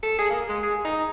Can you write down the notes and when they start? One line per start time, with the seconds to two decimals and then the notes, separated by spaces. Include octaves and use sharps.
0.03 A4
0.19 G#4
0.30 A#3
0.49 G#3
0.63 G#4
0.85 D#4